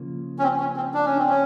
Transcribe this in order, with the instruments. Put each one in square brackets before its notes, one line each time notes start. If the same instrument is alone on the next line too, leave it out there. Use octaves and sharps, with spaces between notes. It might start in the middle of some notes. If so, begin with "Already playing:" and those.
Already playing: [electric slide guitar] C#3 F3 A#3
[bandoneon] C#4
C4
C#4
C4
D4
C#4
C4
C#4